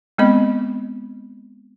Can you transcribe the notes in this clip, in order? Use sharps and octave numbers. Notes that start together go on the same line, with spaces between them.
G#3 B3 C4 D#5 B5